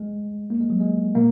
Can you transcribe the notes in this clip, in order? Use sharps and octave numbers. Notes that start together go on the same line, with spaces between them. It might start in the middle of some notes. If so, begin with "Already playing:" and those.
Already playing: G#3
A#3
G#3
F#3
G#3
A#2 A#3